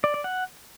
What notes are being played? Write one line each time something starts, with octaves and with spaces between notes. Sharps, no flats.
D5
D5
F#5